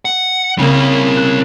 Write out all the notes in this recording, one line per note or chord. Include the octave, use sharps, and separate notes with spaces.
F#5
C#3 A#3 C4 E4
F#6